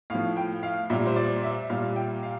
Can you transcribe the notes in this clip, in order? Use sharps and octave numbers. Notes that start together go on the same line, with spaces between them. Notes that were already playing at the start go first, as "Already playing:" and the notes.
A2 F3 F5
G5
F5
A#2 G3 E5
C5
D5
E5
A#2 G3 F5
G5
F5